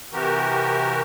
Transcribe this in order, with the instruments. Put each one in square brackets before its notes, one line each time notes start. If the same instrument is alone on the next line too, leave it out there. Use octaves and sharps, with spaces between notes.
[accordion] C3 E3 F#4 G4 A#4